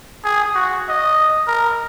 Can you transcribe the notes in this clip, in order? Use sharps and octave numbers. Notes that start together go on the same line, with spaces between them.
G#4
F#4
D#5
A#4